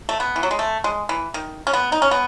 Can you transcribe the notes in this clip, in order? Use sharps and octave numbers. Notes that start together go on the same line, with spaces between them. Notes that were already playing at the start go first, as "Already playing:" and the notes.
A3
B3
E3
F#3
G#3
A3
G#3
E3
D#3
C#4
B3
D#4
C#4
B3